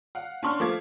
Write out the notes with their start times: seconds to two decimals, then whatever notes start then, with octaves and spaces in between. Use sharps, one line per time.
0.15 F5 F#5
0.43 C#4 D4 C6 C#6 F6
0.60 F3 A3 F5 D6 G#6